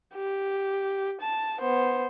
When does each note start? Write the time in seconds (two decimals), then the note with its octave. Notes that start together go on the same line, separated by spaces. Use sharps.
0.15 G4
1.21 A5
1.60 B3 C5